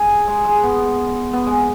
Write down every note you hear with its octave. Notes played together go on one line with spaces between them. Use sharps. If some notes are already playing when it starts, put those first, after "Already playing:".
Already playing: G#4
G#3
G#3
B3
B3
G#3